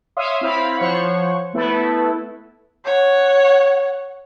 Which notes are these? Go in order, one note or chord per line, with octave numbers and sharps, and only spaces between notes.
C#5 E5 F5 C6 D#6
C4 E4 F5 B5
F3 C5 C#5 F#5 C#6
A3 B3 E4 A4 B4
C#5 F#5